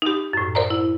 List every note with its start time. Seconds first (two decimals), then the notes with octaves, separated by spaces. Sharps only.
0.02 D#4 G4
0.33 F#2 A2
0.55 A#4 C5 D5 A#5
0.70 E4